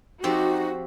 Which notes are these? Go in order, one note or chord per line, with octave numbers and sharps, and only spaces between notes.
F3 C4 D#4 F#4 G4